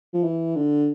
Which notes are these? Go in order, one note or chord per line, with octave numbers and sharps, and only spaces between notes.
F3
E3
D3